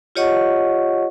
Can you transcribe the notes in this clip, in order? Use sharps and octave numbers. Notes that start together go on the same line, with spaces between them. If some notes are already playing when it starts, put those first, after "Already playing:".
F4 G4 C#5 D#5 F#5 C#6